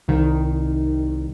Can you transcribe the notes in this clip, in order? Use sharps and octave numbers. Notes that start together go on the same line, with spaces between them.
C2 D#3